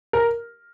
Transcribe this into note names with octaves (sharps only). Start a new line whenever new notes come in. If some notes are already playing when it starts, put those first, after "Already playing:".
A#4